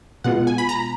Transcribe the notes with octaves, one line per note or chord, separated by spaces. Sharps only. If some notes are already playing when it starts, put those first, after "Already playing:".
B2 G#3 B3 F4 F#5
G#5
B5
A#5